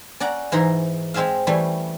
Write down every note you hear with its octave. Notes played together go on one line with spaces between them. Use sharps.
C#4 D5 F#5 A#5
G#2 E3 D#4 A#5 C6
G#3 C4 G#4 E5 F5
E3 G3 A3 C#4